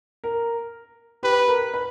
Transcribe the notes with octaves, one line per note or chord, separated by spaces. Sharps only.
A#4
G4 B4
A#4
B4